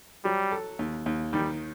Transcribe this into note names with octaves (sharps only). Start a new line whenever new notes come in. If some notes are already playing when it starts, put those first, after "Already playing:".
F#3 G3
A4
D#2
D#2
D#3 G3